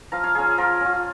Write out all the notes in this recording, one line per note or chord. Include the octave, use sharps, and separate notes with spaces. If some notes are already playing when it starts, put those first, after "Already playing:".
F3 F5 A#5
C#5 F5
C#4 F4 G#4
G#4
F3 F4 A#4
C#4 F4